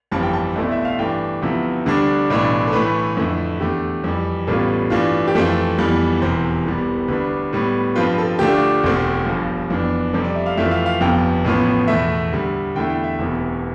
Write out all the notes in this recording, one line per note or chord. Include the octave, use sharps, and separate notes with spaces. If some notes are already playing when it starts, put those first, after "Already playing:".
G1 F2 E3 G3 C4 A5
G5
A5
B1 B2 A3 C4 E4 D5
E5
F5
G2 E3 A3 D4 G5
D2 C3 F3 B3 E4
D2 D3 G3 D4
B1 A2 E3 G3 D4
A4
A2 E3 A3 B4
F2 D3 A3 E4
E2 D3 A3 G4
F2 E3 G3
A1 A2 G3 B3 F4 A4
G2 E3 A3 D4 F4
G4
F2 E3 A3 C4 F4 A4
F2 E3 G3 B3
E1 E2 C3 E3 C5
C2 C3 E3 G3 B3
D2 D3 G3 D4 B4
A2 G3 B3
G2 F3 C4 F4 B4
A4
D2 D3 A3 D4 F4 G4
E1 D2 D3 A3 C4
G1 G2 F3
F2 E3 B3 D4
F2 C3 G3 C4 A4
D5
E5
F5
F2 E3 A3 C4 F4 E5
F5
F5
G1 F2 C3 F3 B3 G5
A1 A2 F3 B3
E2 B2 A3 E5
D2 D3 G3
E2 D3 A3 E4 G5
G5
E5
E1 D2 C3 E3 B3